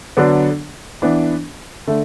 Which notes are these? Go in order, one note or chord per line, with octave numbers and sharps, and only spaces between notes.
D3 F#3 B3 D4
E3 B3 D4
D3 A3